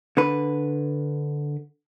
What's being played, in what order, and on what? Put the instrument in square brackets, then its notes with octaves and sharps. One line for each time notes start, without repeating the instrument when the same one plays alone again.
[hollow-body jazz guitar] D3 B4